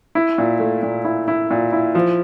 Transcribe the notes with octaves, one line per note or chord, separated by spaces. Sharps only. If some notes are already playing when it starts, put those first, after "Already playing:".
E4
A#2
A3
A#2
E4
E4
A#2
E4
F3